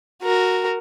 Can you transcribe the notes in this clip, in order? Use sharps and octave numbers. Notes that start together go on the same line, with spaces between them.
F#4 A#4